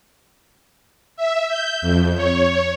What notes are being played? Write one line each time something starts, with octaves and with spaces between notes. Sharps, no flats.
E5
G6
F2
C#5